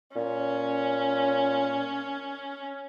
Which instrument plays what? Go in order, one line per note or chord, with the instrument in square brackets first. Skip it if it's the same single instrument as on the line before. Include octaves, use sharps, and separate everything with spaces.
[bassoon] A#2 [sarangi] C#4